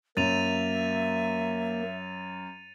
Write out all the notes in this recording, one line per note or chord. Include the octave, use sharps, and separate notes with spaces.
F#2 A#3 E5 A6 D#7 F7